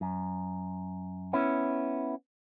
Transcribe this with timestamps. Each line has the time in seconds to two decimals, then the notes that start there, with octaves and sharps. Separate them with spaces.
0.01 F#2
1.33 B3 C#4 E4